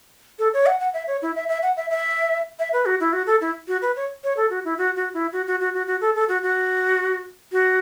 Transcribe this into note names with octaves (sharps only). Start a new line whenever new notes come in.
A4
C#5
F#5
F#5
E5
C#5
E4
E5
E5
F#5
E5
E5
E5
B4
F#4
E4
F#4
A4
E4
F#4
B4
C#5
C#5
A4
F#4
E4
F#4
F#4
E4
F#4
F#4
F#4
F#4
F#4
A4
A4
F#4
F#4
F#4